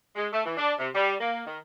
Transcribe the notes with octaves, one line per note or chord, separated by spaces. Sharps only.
G#3
A3
E3
D4
C3
G3
A#3
D#3